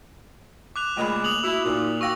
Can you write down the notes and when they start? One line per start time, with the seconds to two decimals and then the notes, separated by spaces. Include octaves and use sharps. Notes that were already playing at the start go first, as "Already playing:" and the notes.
0.76 D6 F#6 F7
0.97 A#2 C#3 G#3 A3 F4 B5
1.24 A#3 D#6 F7 F#7
1.44 E4 F#4
1.65 A#2 D#4 F#4
2.01 F#4 F5 G5 C#6 E6 A#6